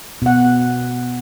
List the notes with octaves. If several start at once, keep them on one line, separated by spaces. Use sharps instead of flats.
B2 F#5